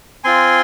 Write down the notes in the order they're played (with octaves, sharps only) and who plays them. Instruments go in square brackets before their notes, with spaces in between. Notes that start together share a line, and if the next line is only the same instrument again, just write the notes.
[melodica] C4 F4 G#5 C6